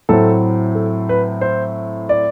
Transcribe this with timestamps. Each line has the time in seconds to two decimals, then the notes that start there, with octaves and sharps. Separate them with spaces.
0.09 A2 F#3 A3 C4 A4
0.75 A4
1.09 B4
1.41 C5
2.09 D5